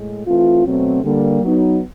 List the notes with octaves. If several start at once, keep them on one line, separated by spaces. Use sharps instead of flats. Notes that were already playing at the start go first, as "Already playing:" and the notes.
Already playing: A2 G#3
E3 A3 C4 F4
B2 F#3 A3 C4
D3 G3 A#3
F#3 B3 D#4